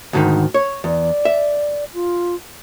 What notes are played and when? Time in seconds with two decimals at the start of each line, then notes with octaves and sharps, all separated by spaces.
0.13 D2 G#2 D#3
0.54 C#5
0.84 E2 D5
1.25 E5
1.94 F4